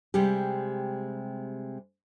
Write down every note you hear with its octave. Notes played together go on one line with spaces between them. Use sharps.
C3 G3 G#3 G4